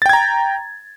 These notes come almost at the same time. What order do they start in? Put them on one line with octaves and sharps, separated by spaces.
A6 G5 G#6 A#5